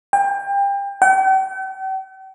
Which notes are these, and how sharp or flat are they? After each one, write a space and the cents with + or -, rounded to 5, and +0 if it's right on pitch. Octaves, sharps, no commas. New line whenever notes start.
G5 +30
G5 -45